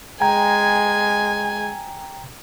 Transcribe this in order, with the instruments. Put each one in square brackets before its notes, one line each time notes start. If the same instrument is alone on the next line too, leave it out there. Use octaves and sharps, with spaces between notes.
[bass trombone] G#3 [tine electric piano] G5 A#5 G#6 [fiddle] G#5